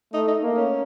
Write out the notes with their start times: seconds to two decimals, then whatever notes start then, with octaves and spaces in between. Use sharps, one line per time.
0.13 A3 D#4
0.28 D#4
0.43 A#3
0.57 C#4